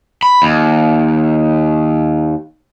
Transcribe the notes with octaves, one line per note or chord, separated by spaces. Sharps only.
B5
D#2